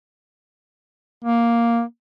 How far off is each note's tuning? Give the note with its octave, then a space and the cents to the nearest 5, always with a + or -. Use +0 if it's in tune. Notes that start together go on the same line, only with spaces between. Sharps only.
A#3 +5